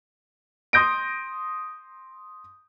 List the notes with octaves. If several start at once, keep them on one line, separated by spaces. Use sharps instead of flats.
C6 D#6 G6 A#6 D7